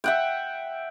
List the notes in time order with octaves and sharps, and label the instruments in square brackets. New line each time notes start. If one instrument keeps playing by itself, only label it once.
[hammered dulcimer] E5 F#5 G5